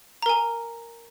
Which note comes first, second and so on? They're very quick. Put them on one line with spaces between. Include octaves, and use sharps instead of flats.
A#5 A#4 G#5